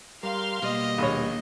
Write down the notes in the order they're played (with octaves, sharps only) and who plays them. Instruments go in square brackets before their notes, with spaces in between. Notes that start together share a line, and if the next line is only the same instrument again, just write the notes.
[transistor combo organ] G3 A#4 [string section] F5 C6 F6
[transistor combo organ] B2 G3 [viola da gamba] A#3 D#5
[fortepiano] A#1 C#5 [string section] D#2